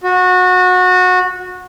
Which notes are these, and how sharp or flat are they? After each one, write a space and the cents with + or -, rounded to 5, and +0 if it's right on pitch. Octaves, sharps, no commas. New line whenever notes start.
F#4 -20